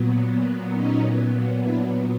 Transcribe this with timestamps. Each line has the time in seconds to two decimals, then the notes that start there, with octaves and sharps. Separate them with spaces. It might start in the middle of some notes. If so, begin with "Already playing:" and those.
Already playing: A#2 F#3 B3
0.72 C#4 D#4
1.59 D4 E4